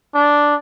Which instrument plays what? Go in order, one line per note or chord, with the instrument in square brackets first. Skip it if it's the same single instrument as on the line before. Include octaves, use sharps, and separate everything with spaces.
[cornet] D4